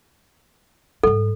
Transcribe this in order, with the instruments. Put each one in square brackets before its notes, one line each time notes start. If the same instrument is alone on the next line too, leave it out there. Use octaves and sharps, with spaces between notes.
[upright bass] G#2 G3 [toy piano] A4